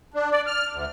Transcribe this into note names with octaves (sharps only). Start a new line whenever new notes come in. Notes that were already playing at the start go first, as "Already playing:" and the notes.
D4
D5
F6
D2